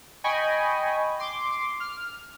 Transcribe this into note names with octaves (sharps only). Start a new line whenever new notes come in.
D#5 G5 G#5 B5 C#6
C6 D6
F6